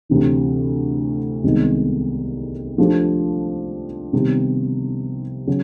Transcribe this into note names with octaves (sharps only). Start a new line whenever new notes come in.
D2 C3 E3
C2 C3 D#3 G#3 B3
F3 A3 D4 G4
C3 D#3 G3 B3
C#3 F#3 C#4